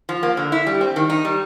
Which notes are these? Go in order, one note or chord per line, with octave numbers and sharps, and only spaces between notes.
F3
A#3
D3
E4
G3
C4
D#3
D#4
G3